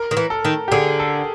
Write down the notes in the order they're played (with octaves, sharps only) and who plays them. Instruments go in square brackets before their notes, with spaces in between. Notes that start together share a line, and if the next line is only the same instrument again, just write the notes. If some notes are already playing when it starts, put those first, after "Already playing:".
Already playing: [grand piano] A#4
[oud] D#3
E3
[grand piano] A4
[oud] D#3
[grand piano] G4
[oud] D3 [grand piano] G#4
[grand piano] A4